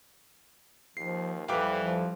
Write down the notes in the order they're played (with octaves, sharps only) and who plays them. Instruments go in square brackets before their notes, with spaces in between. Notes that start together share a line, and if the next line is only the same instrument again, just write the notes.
[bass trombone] D#2 [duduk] F3 [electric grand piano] C7
[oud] F2 G3 [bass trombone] E3 [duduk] B4 [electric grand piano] F5 G5 D6
[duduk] F3